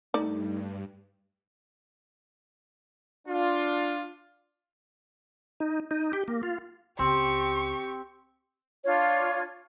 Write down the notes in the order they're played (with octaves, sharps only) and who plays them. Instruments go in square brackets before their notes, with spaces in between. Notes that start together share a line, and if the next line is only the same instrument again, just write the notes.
[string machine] G2 [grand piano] A3 [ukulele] D#4 [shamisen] D5
[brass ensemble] D4 F4
[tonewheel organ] D#4
D#4
G4
A#3
F4
[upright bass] C#2 [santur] C4 [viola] G4 [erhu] C#6
[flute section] D4 F4 C#5